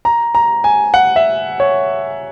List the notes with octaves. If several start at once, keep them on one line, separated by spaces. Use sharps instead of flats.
A#5
A#5
G#5
F#5
E5
C#5